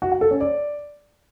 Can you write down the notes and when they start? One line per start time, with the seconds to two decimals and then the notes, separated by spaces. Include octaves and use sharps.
0.02 F#4
0.12 F#5
0.21 A4
0.31 C#4
0.41 D5